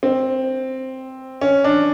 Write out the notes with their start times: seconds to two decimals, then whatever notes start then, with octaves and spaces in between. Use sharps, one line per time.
0.03 C4
1.41 C#4
1.64 D4